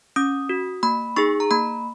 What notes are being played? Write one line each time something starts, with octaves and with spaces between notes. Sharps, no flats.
C#4 D#6
F#4
A#3 B5
D#4 G#4 C#6
A#5
A#3 B5